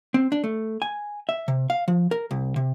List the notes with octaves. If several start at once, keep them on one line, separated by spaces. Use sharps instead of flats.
C4
D4
A3
G#5
E5
C3
F5
F3
A#4
C2
C3